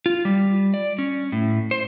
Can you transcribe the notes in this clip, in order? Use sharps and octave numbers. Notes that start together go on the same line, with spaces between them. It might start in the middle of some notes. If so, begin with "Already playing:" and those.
F4
G3
D5
C#4
A2
C5